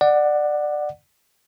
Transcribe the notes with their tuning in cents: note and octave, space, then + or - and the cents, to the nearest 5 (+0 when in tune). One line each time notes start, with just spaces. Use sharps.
D5 +20 F#5 +0